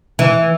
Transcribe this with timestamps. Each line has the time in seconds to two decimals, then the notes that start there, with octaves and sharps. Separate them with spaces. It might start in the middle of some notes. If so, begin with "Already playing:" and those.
0.19 E3